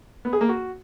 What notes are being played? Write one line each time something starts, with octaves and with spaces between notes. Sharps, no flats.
B3
G#4
A#3
F#4